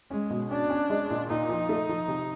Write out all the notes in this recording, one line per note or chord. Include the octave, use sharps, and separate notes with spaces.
G#3 C#4
B2
C#4 D4
C#4
G#3
A#2
A#2 D#4
F3
A3
F3
C3